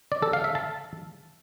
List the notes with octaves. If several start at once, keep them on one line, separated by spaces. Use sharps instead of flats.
D5
A4
F5
E5
A5